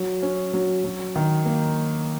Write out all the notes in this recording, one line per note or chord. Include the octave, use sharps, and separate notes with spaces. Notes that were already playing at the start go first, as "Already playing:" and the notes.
Already playing: F#3
C#4
F#3
F#3
D#3
A#3